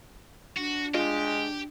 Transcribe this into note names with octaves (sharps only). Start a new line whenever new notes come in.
D4 F#4
G#3 F4 G4 D#5 F5